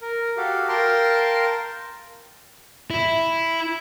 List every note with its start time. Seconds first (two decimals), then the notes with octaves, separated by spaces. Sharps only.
0.01 A#4
0.37 F#4 G4 A4 F5
0.68 A#4 F5 G5 A5 C6
2.91 E4